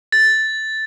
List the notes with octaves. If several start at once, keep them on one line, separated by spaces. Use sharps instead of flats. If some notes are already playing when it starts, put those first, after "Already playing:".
A6